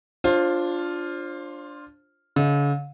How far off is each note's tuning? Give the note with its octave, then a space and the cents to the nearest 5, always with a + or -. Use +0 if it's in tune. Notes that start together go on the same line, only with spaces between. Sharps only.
D4 +0 F4 +0 C5 +30
D3 -45 E5 -45